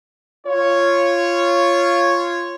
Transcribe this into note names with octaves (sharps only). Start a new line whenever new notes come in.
F4 C#5